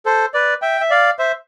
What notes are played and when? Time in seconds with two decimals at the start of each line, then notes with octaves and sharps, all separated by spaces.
0.06 A4 C5
0.34 B4 D5
0.62 E5 G5
0.81 E5
0.90 D5 F5
1.19 C5 E5